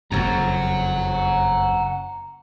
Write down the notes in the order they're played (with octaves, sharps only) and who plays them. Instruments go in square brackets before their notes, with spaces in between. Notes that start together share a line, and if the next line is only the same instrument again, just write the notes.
[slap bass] F#1 F2 [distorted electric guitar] F#5 A#5